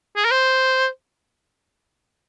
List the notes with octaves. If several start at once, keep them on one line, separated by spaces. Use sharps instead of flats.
G#4
A#4
C5